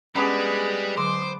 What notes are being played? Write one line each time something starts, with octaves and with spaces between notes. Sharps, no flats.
G3 G#3 B3 C#4 D4 G#4 B4
D3 F#3 C5 D6